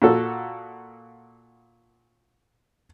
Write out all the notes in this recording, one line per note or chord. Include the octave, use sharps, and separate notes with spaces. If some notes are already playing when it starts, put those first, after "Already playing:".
A#2 F#4 A4